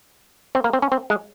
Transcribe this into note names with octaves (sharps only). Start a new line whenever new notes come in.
C4
A#3
C4
C#4
C4
G#3